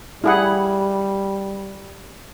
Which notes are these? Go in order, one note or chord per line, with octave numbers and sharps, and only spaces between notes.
G3 E4 G#4 F#5